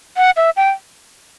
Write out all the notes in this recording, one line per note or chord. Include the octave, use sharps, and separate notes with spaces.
F#5
E5
G5